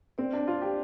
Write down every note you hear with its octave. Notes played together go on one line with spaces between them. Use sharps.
C4 D5
D4
C4 F4
G4